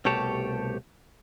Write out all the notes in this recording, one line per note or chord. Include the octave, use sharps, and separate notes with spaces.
C2 B2 A3 G4 C#5 A5